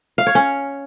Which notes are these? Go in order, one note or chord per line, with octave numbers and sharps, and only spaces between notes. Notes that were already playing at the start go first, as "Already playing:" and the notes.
F5
C#5
C#4